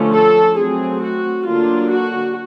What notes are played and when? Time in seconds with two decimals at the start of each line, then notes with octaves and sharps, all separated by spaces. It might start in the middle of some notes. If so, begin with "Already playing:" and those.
Already playing: D3 F3 A3 C#4
0.13 A4
0.57 F#3 A3 C4 G#4
1.01 F#4
1.45 D3 F#3 A#3 D4 F4
1.91 F#4